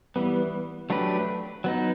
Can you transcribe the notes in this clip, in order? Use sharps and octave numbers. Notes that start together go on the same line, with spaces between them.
E3 G3 B3
F#3 A3 D4 G4 B4
F#3 B3 D#4